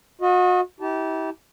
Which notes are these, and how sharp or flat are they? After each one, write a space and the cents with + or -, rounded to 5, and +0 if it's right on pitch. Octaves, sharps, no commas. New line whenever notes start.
F#4 -35 D#5 +15
E4 -40 G4 -25 A5 -10